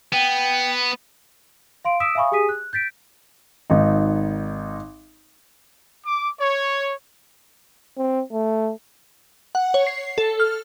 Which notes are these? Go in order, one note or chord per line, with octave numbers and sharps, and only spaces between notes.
B3 G5
F5 C6 D7
D#6 E6 B6 D7 E7
E5 F5 G#5 B5 C#6 D#6
G4 G#4 G#5 D#6 B6 D#7
F#6
G6 A6 B6 D7
G#1 D#4
D6
C#5
C4
A3
F#5
C#5
C7
A4
F6